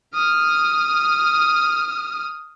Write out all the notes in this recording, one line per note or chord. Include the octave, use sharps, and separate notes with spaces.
D#6 F6